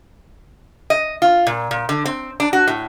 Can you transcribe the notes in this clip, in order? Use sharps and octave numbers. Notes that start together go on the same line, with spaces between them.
D#5
F4
A#2
A#2
D3
C4
D4
F#4
A2